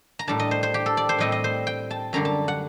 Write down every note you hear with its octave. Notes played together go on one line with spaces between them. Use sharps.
A#5
A2 G3 D4 A5
D#5
C5
C5
G4
A4
D5
C5
A2 G3 C4 D#5
D#5
C5
G5
A5
F#2 D3 G3 D4 A#5
A5
F#5